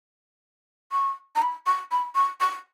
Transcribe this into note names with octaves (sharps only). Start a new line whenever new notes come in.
C#6
A#5
B5
C#6
B5
C#6
C#6